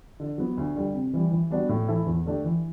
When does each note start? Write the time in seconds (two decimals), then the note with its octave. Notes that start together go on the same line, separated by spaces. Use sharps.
0.20 D3
0.38 F#3 B3
0.57 D2
0.76 D3 G3
0.94 C3
1.13 E3 G3
1.31 E3
1.50 G3 B3 D4 F#4
1.69 A2
1.88 E3 A3 E4 A4
2.06 E2
2.26 D3 A3 D4 G4
2.44 E3